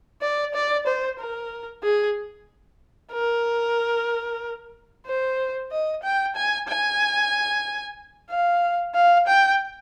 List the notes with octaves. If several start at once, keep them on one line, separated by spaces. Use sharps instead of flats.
D5
D5
C5
A#4
G#4
A#4
C5
D#5
G5
G#5
G#5
F5
F5
G5